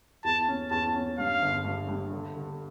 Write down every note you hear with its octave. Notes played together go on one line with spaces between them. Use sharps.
E2 A5
C#4
E2 A5
C#4
G2 F5
G1
G2
G2
D3
D3